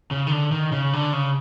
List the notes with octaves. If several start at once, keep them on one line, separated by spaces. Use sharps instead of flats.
C#3
D#3
D3
D#3
C#3
D3
C#3